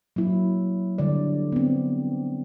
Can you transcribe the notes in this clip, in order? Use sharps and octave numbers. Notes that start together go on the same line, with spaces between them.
F#3 A#3 E4
D3 G3 D5
B3 C4